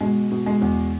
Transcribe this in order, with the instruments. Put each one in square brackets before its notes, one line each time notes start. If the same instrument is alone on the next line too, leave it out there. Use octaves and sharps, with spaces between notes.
[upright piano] B2 G#3
B2
G#3
E2